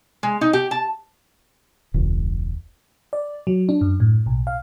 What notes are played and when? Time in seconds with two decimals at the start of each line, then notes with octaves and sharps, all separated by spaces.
0.23 G#3
0.41 D#4
0.53 G4
0.71 A5
1.94 E1 C#2
3.13 D5
3.47 F#3
3.69 D4
3.81 F#2
4.00 A2
4.26 B1
4.47 F5